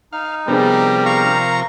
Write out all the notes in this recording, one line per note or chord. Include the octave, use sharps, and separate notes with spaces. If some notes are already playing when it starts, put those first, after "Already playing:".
D#4 F5
C3 F3 G3 B3 D4 G#4 A#4
F5 A#5 C#6